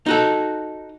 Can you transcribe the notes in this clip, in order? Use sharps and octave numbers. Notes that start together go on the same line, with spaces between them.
D#4 F#4 A4